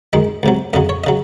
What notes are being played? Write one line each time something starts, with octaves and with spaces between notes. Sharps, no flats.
F#2 D#3 G#3 D#5
C#2 C3 F#3
F2 C#3 F#3 D#5
C#5
C#3 F#3 D#5